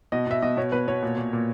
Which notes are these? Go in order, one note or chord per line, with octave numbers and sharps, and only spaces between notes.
B2 D#5
B2 E5
B2 D#5
B2 C#5
B2 B4
B2 C#5
A#2
A#2
A#2